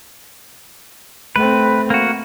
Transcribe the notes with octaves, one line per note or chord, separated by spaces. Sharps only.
A3 C4 B4
A#3 F#4